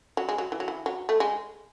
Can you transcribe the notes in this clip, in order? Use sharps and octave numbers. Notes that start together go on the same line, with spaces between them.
F#3
G#3
F#3
E3
F#3
E3
F#3
A3
G#3